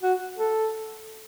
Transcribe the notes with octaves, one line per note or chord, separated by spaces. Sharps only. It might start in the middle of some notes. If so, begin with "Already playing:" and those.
F#4
A4